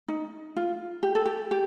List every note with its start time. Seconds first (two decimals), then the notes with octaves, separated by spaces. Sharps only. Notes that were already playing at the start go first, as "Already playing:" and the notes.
0.08 D#4
0.56 F4
1.03 G4
1.15 A4
1.26 G4
1.51 G4